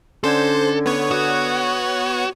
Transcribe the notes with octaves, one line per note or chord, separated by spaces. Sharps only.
D3 C#4 A4 C5 G#6
B3 C#5
F#4 D#6 F#6